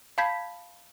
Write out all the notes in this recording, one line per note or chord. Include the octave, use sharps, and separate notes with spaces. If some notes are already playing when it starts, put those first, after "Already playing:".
F5 A5 B5 G6 G#6 B6